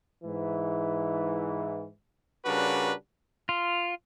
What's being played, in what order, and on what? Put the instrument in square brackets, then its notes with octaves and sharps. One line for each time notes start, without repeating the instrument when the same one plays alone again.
[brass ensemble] G#2 E3
[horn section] C#3 G3 D4 F#4 A#4 B4
[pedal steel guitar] F4